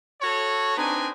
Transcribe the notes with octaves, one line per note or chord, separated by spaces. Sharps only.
F#4 A4 C#5
C4 D4 D#4 B4 G#5